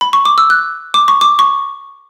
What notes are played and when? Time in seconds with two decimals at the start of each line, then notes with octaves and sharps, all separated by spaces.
0.01 B5
0.13 C#6
0.25 D6
0.38 E6
0.50 F#6
0.94 D6
1.08 C#6
1.21 D6
1.39 C#6